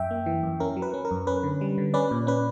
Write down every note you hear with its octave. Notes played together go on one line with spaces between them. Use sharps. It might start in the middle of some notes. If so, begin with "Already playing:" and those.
Already playing: F#2 E5 G5
A#3
E3
F#2
C#4 A#4
F#3
B4
C#4
A#4
F#2
C#4 B4
D3
G3
D3
C#4 B4 D5
A#2
C#4 B4